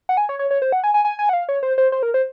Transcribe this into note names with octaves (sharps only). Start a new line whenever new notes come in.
F#5
G#5
C#5
C#5
C#5
C5
F#5
G#5
G#5
G#5
G#5
F#5
F5
C#5
C5
C5
C5
A#4
C5